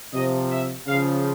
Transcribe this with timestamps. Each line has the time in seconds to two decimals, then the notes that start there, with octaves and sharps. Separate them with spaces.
0.13 C3 F3 D#5
0.50 E5
0.87 C#3 F3 F5